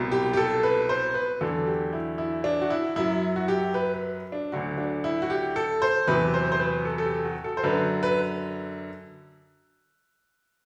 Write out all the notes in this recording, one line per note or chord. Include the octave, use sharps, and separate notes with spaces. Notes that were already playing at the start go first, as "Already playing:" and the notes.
Already playing: C2 B2 F#3
G4
G4
A4
B4
C5
B4
E2 D3 F#3 A4
G4
E4
E4
D4
F#4
E4
F#2 F#3 E4
F#4
G4
B4
B4
D4
D2 D3 F#3 F#4
D4
E4
F#4
G4
A4
C5
E2 C3 F#3 B4
C5
C5
B4
A4
A4
G4
F#4
A4
C5
F#2 D3 F#3 B4
B4